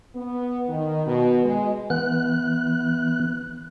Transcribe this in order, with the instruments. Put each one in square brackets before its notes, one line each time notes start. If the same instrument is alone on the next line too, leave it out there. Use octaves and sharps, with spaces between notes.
[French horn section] B3
D#3
B2
G#3
[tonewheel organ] E3 B3 F#6